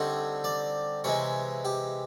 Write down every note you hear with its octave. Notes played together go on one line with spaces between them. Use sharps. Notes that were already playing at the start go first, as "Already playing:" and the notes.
Already playing: D3 G3 C4 D#4 C#5
D5
C3 E3 G#3 C#5
G4